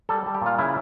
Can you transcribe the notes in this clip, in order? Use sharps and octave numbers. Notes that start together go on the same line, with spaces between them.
G3 A4
G3
G4
A#2 F4
C#3 E4